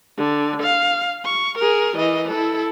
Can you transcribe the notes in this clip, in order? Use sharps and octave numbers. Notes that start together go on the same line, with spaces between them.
D3
F5
C#6
G#4 A#4
E3 D#5
E4 A4